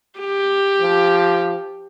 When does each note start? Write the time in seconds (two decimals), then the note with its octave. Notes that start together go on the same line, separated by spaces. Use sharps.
0.19 G4
0.81 F3